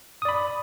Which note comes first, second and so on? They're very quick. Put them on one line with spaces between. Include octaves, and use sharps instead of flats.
D#6 D5 B5